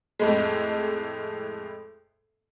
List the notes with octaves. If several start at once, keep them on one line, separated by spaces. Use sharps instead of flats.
F2 A2 G#3